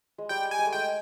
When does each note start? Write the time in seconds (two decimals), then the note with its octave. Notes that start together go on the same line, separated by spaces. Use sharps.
0.18 G#3
0.29 G3 G5
0.51 G#5
0.59 G#3
0.66 A3
0.73 G#3 G5